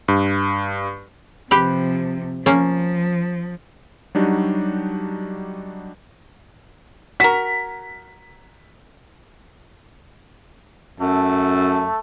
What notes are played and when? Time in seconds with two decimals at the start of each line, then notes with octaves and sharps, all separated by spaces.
0.08 G2
1.51 C3 F3 G4 B4
2.46 F3 A#3 C#4
4.15 F#3 G3 D4 D#4 F#4 G4
7.20 F#4 A#4 B6
11.00 F#2 A3 A4